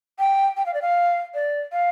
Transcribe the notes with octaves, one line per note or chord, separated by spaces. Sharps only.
G5
G5
F5
D5
F5
D5
F5